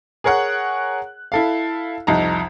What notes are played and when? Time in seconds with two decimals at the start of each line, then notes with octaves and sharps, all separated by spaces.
0.24 G#4 A#4 C#5 F#5 F#6
1.32 E4 A4 F5
2.07 C2 F2 D#4 A5 A#5